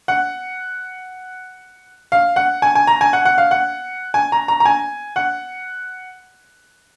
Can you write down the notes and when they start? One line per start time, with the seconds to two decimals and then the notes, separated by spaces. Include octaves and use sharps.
0.08 F#5
2.12 F5
2.36 F#5
2.62 G#5
2.75 G#5
2.87 A#5
3.01 G#5
3.13 F#5
3.25 F#5
3.38 F5
3.51 F#5
4.14 G#5
4.32 A#5
4.48 A#5
4.60 A#5
4.66 G#5
5.16 F#5